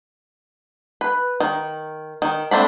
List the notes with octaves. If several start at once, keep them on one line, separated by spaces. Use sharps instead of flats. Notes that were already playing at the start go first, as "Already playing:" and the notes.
B4
D#3
D#3
A3 C4 D4 B5